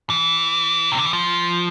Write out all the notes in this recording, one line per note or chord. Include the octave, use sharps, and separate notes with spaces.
E3
C3
D3
E3
F3